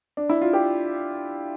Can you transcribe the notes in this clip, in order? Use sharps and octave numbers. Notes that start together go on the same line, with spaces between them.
D4
E4
F4
G4